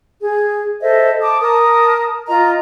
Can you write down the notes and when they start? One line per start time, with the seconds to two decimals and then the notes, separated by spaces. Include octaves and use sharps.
0.21 G#4
0.82 A4 C5 D#5 E5
1.22 A5 D6 D#6
1.40 A#4 A5 D#6
2.28 F4 D#5 A#5